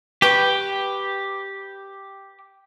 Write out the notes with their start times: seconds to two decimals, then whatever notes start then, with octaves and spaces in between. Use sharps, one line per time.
0.22 G4 B4 G5 C#6